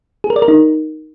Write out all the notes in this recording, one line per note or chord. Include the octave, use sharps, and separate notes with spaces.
G#4
A#4
D5
A#4
D#4